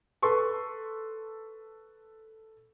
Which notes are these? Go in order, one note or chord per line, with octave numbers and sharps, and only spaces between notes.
A4 B4 C6 C#6